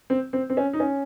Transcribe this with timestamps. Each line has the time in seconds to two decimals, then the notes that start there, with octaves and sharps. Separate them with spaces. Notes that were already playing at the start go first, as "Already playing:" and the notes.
0.10 C4
0.33 C4
0.50 C4
0.57 C#4
0.73 D#4
0.80 C#4